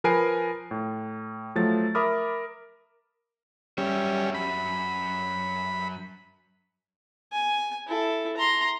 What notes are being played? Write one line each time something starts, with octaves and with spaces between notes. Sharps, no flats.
F3 A#4 B4 G#5 C7 D7
A2
F3 F#3 A3 A6
A#4 E5 B5 D6 D#6 F6
F#2 G3 C#4 E5
B5
G#5
E4 A4
A#5 C6